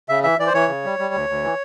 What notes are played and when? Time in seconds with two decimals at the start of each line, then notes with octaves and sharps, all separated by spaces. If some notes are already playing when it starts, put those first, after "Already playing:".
0.09 C#3 E5
0.24 E3 E5
0.39 E3 D5
0.47 C5
0.54 E3 C#5
0.68 C#3
0.85 G3
0.99 G3
1.14 D2
1.29 D2
1.44 E3